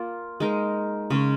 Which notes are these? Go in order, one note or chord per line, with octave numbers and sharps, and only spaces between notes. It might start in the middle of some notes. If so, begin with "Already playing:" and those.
Already playing: A#3 F4
G#3 D#4 A#4
C#3 G#3 C#4